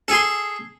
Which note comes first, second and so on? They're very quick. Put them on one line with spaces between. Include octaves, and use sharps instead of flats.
A4 G#4 C6